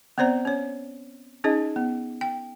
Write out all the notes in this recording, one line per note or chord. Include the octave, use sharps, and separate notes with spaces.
B3 C4 C5 D5 A#5
C#4 C#5
C#4 D#4 G#4 D#5
B3
G5